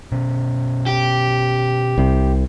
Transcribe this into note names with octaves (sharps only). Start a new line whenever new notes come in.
B2 C#4
G4
C2 C3